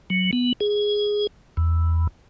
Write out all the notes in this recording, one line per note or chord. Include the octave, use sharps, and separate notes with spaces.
F#3
B3
G#4
E2